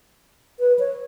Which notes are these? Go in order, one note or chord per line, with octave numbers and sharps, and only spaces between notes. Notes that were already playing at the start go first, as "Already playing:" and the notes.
B4
C#5